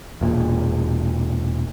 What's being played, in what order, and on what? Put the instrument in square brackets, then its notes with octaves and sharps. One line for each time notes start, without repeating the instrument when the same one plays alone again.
[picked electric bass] E1 A#2